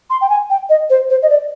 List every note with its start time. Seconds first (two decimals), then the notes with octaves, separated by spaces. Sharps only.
0.10 C6
0.21 G5
0.29 G#5
0.50 G5
0.69 D#5
0.89 C5
1.09 C5
1.22 D#5
1.29 D5